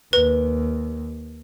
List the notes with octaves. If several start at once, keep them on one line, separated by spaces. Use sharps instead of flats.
D#2 B4